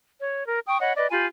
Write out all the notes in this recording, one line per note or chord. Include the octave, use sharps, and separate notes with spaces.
C#5
A#4
G5 C#6 D#6
C#5 D#5 F#5 B5
B4 D5 D#5
F4 G4 G#5 B5